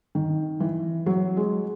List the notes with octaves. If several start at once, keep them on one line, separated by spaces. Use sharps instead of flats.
D#3
E3
F#3
G#3